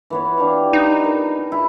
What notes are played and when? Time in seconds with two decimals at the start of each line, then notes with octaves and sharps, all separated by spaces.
0.10 E3 B3 C#5
0.38 D4 G4 F5
0.73 D#4
1.04 A#4
1.52 E4 G#4